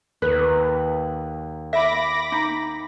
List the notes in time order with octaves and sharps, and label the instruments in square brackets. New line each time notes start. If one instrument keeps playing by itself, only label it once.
[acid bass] D#2 [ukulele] B4
[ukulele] E5 [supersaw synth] B5 D6 A#6
[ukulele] D#4